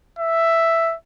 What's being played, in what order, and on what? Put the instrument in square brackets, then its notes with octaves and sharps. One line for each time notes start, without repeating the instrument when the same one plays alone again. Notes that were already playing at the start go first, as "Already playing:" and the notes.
[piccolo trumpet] E5